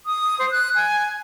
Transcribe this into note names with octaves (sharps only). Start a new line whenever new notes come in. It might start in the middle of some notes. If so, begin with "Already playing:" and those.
D#6
C5
F#6
G#5